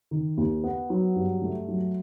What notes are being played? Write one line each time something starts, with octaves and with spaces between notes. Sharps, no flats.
D#3
D#2
B3
F#3
G2
A3
F#3